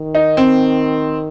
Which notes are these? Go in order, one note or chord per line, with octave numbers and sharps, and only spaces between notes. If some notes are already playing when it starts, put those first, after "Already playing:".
Already playing: D#3
D#4
C4